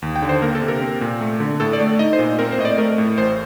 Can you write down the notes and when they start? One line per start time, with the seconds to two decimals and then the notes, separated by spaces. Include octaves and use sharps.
0.02 D#2
0.16 G5
0.22 D3
0.29 C5
0.42 A#3 A#4
0.55 A4
0.62 C3
0.68 A#4
0.81 C4
1.01 A#2
1.21 A3
1.40 D3
1.60 A2 A4
1.73 D5
1.80 A3
1.99 D#4 D#5
2.13 C5
2.19 A#2
2.39 C4 A#4
2.52 C5
2.58 A2 D#5
2.65 D5
2.78 A3 A#4
2.98 A2
3.18 A1 C5